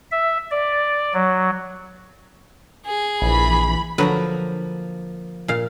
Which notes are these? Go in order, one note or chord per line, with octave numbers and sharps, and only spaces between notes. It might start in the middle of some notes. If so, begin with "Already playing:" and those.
E5
D5
F#3
G#4
A#1 E3 B5
D3 F3 F#3 A#3 B4 A#5
A#2 F5